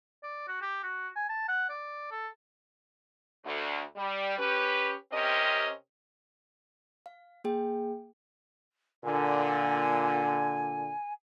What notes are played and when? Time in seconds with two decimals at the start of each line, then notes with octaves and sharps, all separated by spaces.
0.23 D5
0.48 F#4
0.62 G4
0.83 F#4
1.16 G#5
1.29 A5
1.48 F#5
1.70 D5
2.11 A4
3.46 D2
3.96 G3
4.39 C#4 G4 B4
5.11 C3 C4 C#4 G4 A#4 D#5
7.06 F5
7.44 A#3 G#4 G5
9.04 A#2 D3 G#5